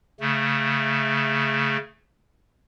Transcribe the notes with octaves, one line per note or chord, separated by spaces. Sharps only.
C#3 A3